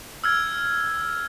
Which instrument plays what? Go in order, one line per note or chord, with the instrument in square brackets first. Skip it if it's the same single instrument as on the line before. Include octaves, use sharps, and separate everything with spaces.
[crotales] E6 F6 G#6